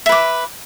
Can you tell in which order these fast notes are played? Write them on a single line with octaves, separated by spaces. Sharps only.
E5 B4 D6